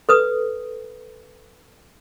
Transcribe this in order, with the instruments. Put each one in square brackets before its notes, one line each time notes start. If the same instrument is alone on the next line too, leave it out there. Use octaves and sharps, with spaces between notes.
[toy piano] A4 B4 D#6